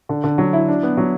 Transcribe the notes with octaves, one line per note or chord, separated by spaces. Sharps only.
D3
D3
F#3
E4
D4
B3
F#3